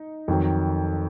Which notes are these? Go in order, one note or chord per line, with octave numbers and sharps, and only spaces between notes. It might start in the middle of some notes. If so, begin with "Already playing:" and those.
Already playing: D#4
F2 D#3 F#3